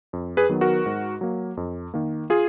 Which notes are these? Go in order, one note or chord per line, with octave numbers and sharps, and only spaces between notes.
F2
G#4 B4
D#3 F#3 B3
F#4 A#4
G#2
F#3 A#3
F2
D#3 A#3
F4 G#4